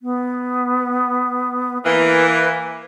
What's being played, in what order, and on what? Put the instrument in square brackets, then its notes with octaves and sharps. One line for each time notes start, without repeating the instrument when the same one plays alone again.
[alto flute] B3
[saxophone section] E3 A#3 [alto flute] B4